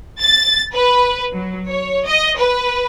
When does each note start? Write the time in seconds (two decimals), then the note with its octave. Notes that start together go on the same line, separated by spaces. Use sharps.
0.20 A6
0.74 B4
1.34 F#3
1.69 C#5
2.06 D#5
2.38 B4